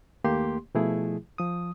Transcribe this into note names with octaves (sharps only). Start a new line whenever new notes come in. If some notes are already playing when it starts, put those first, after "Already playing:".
D#2 A3 A#3 G4 C6
B2 F3 A3 E4 G#4
F3 D#6